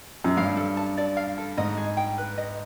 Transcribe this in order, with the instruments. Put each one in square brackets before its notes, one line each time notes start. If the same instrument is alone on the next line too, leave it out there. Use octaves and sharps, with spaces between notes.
[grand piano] F#2
[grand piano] G2 [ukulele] F5
[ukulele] A4
A5
D5
F5
A4
[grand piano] G#2 [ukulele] D#5
[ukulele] G#4
G5
B4
D#5